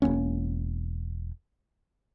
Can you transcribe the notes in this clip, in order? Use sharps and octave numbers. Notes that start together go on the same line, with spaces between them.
E1 F#2 A#3 C#4